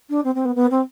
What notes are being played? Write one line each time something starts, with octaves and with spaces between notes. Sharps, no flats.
D4
C4
C4
B3
B3
C4